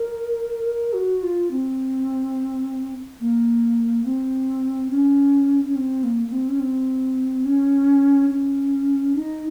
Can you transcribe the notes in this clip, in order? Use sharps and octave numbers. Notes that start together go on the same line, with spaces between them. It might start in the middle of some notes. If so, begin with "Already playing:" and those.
Already playing: A#4
A#4
F#4
F4
C4
A#3
C4
C#4
C#4
C4
A#3
A#3
C4
C#4
C4
C#4
C#4
D#4